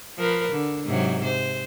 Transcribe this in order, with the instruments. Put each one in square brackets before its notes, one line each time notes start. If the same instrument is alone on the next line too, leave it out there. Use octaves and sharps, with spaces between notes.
[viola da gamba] F3 A#4 B4
D3
G#2 C3 F#3
C5